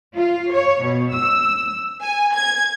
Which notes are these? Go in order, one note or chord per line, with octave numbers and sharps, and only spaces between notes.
F4
C#5
B2
E6
G#5
G#6